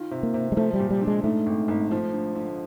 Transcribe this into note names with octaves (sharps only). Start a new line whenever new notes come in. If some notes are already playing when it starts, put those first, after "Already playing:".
Already playing: D#3 F4
C3
A#3
C3
G#3
F3 A3
G3
A#2
G3
D4
G#3
G#2 A3
G#1
G#1
F3
D3
D3